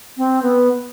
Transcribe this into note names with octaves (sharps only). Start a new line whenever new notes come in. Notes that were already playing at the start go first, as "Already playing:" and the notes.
C4
B3